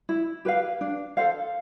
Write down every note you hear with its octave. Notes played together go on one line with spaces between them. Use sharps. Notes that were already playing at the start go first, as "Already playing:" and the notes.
E4
G4 B4 F5
D4
A4 C5 F5